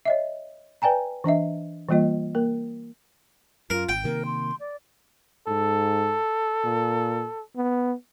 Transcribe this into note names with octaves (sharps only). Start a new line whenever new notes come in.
C#5 D#5 E5
B4 D5 G5 G#5 A#5
E3 D4 D#5 E5
E3 G3 A#3 F4 D#5
A#3 A#4
F#2 F4 A#4
G#1 G5
C3 D#3 A#3 A#4
C6
D5
G#2 A4
A#2
B3